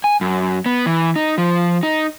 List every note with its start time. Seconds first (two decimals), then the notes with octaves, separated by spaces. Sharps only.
0.04 G#5
0.21 F#2
0.66 B3
0.86 E3
1.16 D#4
1.38 F3
1.83 D#4